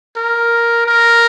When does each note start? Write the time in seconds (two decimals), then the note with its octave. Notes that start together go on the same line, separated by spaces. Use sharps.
0.17 A#4
0.86 A#4